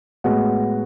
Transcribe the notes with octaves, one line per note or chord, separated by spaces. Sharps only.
A2 G#3 B3 F#4